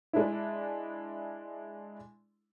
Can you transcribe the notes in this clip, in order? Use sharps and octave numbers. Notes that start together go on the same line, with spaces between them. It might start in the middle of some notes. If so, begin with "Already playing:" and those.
G#3 D4 E4